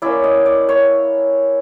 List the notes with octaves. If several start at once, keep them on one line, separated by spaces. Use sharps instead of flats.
A#3 C#4 E4 D5
D#5
D5
C#5